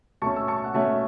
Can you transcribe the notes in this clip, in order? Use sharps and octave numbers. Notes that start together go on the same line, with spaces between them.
B2 A3 C#4 A5 C#6
E6
A5 C#6
F#5
B2 A3 C#4 E5 A5